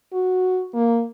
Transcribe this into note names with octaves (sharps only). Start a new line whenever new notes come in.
F#4
A#3